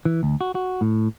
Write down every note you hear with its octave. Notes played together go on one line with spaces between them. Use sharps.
E3
D2
F#4
F#4
A2